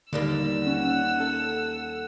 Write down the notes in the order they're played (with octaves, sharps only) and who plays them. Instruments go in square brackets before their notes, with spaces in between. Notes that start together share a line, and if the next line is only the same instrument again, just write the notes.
[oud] D#2 G3 A#3 [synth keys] D3 [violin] E6
[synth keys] C#4 [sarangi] F#5
[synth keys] A4